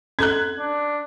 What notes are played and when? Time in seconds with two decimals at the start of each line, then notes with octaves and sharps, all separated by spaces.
0.19 C#4 A4 A#5 F#6 G#6
0.59 D4